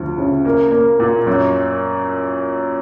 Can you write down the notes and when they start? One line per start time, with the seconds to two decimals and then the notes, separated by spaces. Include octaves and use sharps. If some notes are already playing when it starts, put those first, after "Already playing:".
Already playing: D2 F3
0.18 C#3
0.45 A#3
0.72 A#3
1.00 A#2
1.27 F#2